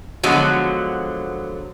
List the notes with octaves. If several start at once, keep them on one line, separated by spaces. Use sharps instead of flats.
D3 F3 F#3 G#3 B3 F#4